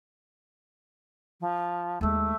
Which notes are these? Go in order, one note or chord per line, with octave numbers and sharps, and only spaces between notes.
F3
D#2 G#3 A3